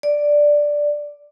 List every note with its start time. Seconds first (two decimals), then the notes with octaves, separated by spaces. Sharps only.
0.03 D5